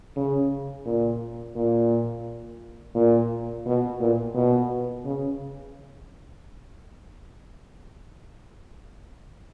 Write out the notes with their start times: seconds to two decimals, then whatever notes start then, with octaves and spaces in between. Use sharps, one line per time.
0.16 C#3
0.86 A#2
1.56 A#2
2.95 A#2
3.66 B2
4.00 A#2
4.35 B2
5.05 C#3